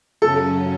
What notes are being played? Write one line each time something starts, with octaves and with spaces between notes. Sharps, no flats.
F#2 C#3 F#3 C#4 A4